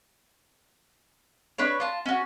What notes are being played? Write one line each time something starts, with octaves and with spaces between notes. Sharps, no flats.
D4 B4 C#5
F4 A5
C#4 F#4